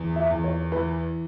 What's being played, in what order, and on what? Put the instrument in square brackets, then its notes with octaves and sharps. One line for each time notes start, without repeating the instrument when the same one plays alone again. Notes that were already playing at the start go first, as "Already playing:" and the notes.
Already playing: [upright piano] E2
[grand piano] E5
[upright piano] E2
[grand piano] C#5
[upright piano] E3 [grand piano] B4